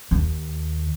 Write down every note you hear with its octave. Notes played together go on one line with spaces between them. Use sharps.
D#2